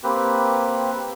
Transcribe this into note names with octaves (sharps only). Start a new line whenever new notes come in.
A#3 C4 G4 B4